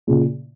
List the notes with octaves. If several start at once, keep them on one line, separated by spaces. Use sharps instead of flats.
A#2 C#3